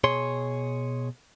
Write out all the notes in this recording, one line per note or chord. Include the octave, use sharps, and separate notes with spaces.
B2 G#4 C#5 C6